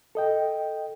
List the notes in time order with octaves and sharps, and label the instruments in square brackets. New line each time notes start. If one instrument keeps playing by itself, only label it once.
[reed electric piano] A4 D#5 G5